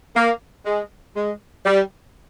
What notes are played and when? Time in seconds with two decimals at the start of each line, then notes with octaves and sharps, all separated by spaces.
0.15 A#3
0.65 G#3
1.16 G#3
1.65 G3